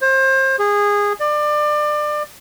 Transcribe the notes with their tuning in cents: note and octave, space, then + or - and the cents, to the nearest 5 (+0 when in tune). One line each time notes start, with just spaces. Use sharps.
C5 +30
G#4 -20
D5 +25